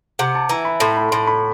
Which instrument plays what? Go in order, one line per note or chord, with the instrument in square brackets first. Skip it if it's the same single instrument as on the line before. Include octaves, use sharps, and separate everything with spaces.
[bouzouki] C3 [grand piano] F#5
[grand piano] A5
[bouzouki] E3 [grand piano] A#5
[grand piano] B5
[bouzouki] A2 [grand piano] C6
[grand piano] B5
[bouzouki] A2 [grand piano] C6
[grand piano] C6
B5